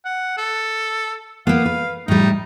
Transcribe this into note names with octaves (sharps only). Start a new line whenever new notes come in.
F#5
A4
A#3 B3 F5
B4
A2 G3 D#4